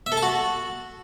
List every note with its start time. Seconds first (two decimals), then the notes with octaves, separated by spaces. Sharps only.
0.06 E5
0.12 A4
0.17 A5
0.23 F#4